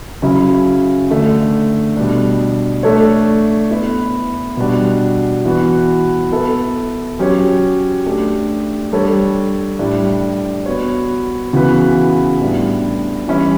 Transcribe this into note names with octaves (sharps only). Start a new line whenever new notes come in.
C#3 F#3 C#4 E4
D3 A3 D4
B2 G3 D4
A3 D4 A4 C#5
B3 E4 B4
B2 G3 D4 F#4
E3 B3 F#4
B3 E4 A4
F#3 C#4 G4 C#5
A3 D4 G4
G3 D4 A4 C#5
A2 G3 D4
B3 F#4 C#5
C#3 E3 B3 F#4 B4
A2 G3 B3 D4
E3 G3 C#4 E4